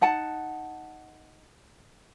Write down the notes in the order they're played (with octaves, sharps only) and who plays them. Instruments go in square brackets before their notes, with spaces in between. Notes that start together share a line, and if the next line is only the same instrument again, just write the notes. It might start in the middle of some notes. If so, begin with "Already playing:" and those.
[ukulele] D#4 F#5 A5